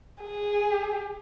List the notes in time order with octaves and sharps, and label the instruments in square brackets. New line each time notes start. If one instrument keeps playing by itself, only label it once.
[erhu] G#4